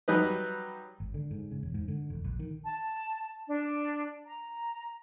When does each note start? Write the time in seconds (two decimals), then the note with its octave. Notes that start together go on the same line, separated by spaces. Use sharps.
0.08 F#3 G3 D#4 B4
1.00 G#1
1.14 D3
1.31 G#2
1.51 C#3
1.63 E1
1.74 G#2
1.88 D3
2.10 E1
2.24 A#1
2.39 D#3
2.63 A5
3.48 D4
4.25 A#5